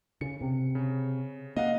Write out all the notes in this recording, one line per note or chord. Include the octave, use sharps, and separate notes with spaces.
C#3 C#7
C3
C#3
A#3 D#5 F5 F#5